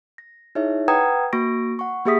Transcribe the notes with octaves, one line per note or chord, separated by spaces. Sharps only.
A#6
D#4 E4 G#4 C#5 E5
B4 F#5 G5 A#5 D#6 G#6
A#3 F#4 C#6 A#6 D7
F#5 C#6
A#3 G4 G#4 E5 D#6 B6